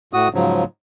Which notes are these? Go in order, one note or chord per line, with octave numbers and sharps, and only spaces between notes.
A2 F#4 D#6
G#2 C#3 F3 F#3